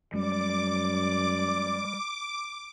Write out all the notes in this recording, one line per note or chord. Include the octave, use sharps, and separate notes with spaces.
F#2 G3 G#3 D5 D6